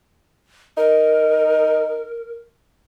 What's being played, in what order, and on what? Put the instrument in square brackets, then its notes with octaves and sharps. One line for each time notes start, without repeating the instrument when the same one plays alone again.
[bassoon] D#4 [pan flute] A#4